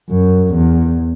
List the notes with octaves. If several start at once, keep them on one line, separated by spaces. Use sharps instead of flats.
F#2
E2